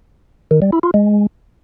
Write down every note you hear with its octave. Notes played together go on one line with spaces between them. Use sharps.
D#3
G3
E4
F4
G#3